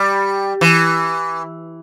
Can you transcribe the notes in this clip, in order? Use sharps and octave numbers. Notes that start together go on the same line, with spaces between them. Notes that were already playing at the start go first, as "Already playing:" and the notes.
Already playing: G3
E3